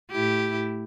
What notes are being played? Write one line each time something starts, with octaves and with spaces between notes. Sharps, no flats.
A2 E4 G4